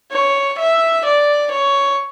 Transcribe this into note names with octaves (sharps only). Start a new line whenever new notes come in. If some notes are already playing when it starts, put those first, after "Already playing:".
C#5
E5
D5
C#5